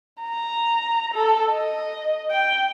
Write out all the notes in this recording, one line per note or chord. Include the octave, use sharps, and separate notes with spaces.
A#5
A4
D#5
G5